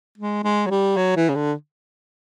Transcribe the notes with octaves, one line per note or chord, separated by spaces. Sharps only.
G#3
G#3
F#3
G3
F#3
E3
C#3
D3